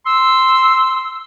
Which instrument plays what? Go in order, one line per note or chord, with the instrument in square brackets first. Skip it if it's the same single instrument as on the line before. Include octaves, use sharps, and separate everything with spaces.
[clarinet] C6 [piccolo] E6